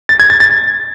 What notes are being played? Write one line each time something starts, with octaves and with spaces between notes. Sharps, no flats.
A6
G#6
A6
A6